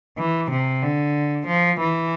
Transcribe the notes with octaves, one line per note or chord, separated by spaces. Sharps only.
E3
C3
D3
F3
E3